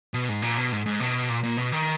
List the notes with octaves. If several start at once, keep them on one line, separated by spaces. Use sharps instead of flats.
B2
G#2
A#2
B2
G#2
G#2
B2
A#2
A#2
B2
D#3